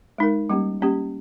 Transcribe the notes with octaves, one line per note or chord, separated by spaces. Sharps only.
G#3 D#4 A#4
G3 A#3 C#4 G4
G3 A#3 C#4 G4